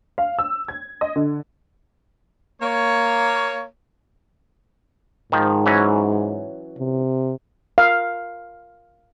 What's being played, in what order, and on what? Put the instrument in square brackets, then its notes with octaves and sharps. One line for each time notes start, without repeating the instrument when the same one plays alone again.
[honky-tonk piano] F5
E6
G#6
D#5
D3
[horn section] A#3 C#5
[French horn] G#2 [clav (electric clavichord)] D#3 F3
[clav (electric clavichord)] E3 F#3 C#4
[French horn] C3
[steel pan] F5